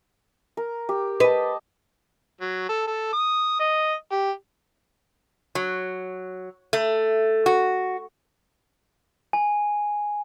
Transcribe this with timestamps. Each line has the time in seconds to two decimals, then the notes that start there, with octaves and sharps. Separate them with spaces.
0.57 A#4
0.89 G4
1.20 B4 D#5 A5
2.41 F#3
2.69 A4
2.87 A4
3.13 D#6
3.59 D#5
4.12 G4
5.55 F#3
6.73 A3
7.46 F#4
9.33 G#5